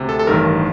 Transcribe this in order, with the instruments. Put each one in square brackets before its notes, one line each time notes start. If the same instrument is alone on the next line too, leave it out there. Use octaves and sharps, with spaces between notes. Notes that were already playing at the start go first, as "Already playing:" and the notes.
Already playing: [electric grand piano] D2 C3
A4
A4
A1 G2 D#3 A#4